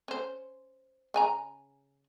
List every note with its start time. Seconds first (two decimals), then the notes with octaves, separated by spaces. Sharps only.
0.08 C#4 C5
1.14 C#3 G#5 A#5